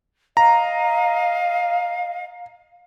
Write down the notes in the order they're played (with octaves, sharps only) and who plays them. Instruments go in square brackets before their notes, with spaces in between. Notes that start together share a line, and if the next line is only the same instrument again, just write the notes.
[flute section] D#5 F5 [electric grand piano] A#5